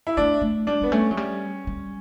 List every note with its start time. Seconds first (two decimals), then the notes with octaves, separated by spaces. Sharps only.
0.07 E4
0.17 A3 D4
0.42 A3
0.67 G3 D4
0.82 G3 B3
0.92 A3 C#4
1.11 F#3
1.17 G3
1.67 G3